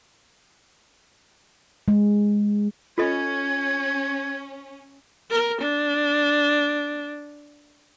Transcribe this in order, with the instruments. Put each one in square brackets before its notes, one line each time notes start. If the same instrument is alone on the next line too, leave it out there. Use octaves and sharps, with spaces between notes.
[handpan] G#3
[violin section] C#4 [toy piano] F4 A4 D#5 [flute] G#6
[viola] A#4
D4